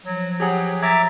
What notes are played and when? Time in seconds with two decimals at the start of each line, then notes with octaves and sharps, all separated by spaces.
0.06 F3 F#3
0.40 F#3 G4 G#4 F#5
0.82 E5 A#5 D6 G#6 A6 B6